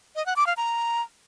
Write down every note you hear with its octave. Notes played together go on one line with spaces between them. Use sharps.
D#5
F#5
D6
F5
A#5